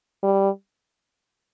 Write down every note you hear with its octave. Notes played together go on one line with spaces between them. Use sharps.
G3